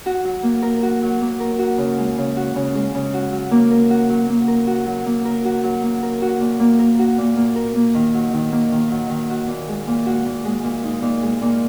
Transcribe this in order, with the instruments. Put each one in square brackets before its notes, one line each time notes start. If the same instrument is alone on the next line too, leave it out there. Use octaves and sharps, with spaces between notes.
[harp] F#4
F#3
A#3
A#4
F#4
F#3
A#3
A#4
F#4
C#3
G#3
C#3
F#4
C#3
G#3
C#3
F#4
F#3
A#3
A#4
F#4
F#3
A#3
A#4
F#4
F#3
A#3
A#4
F#4
F#3
A#3
A#4
F#4
A#2
A#3
A#4
F#4
A#2
A#3
A#4
A#3
D#3
F#3
D#3
A#3
D#3
F#3
D#3
F#4
A#2
G#3
A#2
F#4
A#2
G#3
A#2
D#4
A#2
G#3
A#2